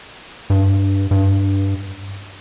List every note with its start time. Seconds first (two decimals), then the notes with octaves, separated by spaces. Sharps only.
0.50 G2
1.11 G2